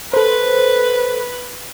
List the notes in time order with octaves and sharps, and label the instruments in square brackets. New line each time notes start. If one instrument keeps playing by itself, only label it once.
[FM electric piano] A4 C5 [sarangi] B4